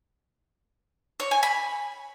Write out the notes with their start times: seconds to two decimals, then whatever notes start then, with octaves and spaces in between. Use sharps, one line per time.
1.20 C#5
1.31 G#5
1.43 B5